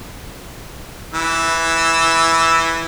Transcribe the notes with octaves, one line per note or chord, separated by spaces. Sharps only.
E3 E6